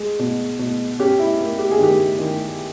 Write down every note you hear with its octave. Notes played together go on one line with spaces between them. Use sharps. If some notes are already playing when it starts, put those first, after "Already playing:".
Already playing: G#3
B2
B2
C#4 G4
E4
A#3
G4
G#4
D#3 G4
D#3